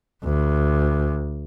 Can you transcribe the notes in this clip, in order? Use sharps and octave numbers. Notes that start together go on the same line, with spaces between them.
D2